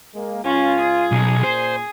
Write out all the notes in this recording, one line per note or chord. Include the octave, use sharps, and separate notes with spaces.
G#3 A#3
C#2 C#4 F4
G#4
B1
A#2 C5